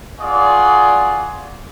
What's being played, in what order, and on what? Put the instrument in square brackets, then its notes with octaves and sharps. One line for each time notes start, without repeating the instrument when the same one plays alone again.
[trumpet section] F4 F#4 G#4 D5